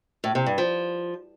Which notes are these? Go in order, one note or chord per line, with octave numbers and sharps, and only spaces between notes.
A2
C3
G2
F3